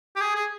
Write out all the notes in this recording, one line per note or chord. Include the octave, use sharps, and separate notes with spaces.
G4
G#4
G#4